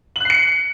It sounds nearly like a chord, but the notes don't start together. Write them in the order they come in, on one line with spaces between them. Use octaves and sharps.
F#7 F#6 C7 C#7